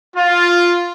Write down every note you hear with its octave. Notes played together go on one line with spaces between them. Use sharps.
F4